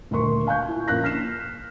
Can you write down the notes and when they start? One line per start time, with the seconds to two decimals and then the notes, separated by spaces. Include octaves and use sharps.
0.11 D#1 D2 G2 A#4 C6 C#6
0.47 F5 G#5 C#6 F#6 G6
0.68 E4 F4
0.88 A#1 F3 A#3 C#4 F#6 A#6
1.04 F6 B6 C7 E7